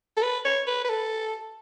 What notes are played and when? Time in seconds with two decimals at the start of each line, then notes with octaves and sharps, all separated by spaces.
0.17 A4
0.23 B4
0.45 C#5
0.67 B4
0.84 B4
0.89 A4